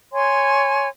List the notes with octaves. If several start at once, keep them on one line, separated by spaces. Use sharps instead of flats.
C#5 G#5 C6